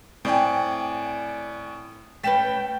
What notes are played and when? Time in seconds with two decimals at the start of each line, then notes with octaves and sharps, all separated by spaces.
0.25 A2 C4 D5 G#5
2.23 A3 C#4 B4 G5 A6 B6 E7